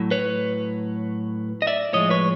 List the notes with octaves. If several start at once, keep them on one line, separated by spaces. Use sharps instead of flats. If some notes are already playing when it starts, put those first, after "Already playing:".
Already playing: A2 F#3
B4 C#5
D#5
D5 E5
A2 F3 G#3 C#5 D#5
B4 C#5